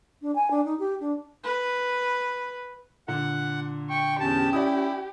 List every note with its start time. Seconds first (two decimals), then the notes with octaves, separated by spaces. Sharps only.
0.22 D4
0.35 G#5
0.51 D4
0.65 D#4
0.79 G4
1.00 D4
1.44 B4
3.08 A#2 D3 F#5
3.90 G5 C#6
4.20 E2 C#4 G4 A5
4.53 E4 D5 D#6